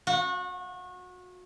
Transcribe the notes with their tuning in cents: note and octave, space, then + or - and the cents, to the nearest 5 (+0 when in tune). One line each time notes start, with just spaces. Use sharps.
F#4 -30